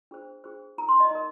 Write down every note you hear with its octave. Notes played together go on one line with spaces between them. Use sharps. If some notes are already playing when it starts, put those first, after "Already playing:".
D4 G#4 C5
D4 G#4 C5
D#4 A#4 A#5
C6
D#5
D#4 A#4 D#5